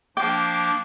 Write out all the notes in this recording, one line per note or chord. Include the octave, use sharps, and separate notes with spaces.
F3 A#3 D4 G5 D6